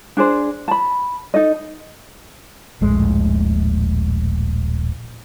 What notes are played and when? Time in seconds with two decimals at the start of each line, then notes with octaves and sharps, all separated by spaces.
0.17 D4 G#4 C5
0.68 A5 B5
1.34 D#4 A4 D#5
2.81 D#1 A#1 A2 G#3